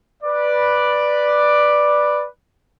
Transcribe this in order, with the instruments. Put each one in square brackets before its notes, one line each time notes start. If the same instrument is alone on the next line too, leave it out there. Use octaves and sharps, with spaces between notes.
[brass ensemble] B4 D5